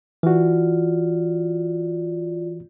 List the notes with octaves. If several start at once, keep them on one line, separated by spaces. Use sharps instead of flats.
E3 F4 F#4 D5